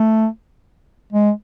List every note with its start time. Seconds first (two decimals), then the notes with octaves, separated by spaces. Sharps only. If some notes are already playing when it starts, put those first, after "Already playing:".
Already playing: A3
1.12 G#3